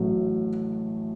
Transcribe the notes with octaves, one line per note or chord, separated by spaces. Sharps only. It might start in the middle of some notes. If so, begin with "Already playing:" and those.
Already playing: A1 A2 F#3